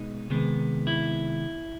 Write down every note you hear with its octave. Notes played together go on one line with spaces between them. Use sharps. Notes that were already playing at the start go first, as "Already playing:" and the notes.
Already playing: B2 G#3 B3 D#4
C3 D#3 G#3 B3
E4